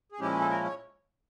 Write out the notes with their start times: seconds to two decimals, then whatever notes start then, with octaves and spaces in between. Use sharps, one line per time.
0.12 G#4
0.20 A#2 F3 G#3 C#4 E4 G4
0.41 A4
0.50 A#4
0.65 C#5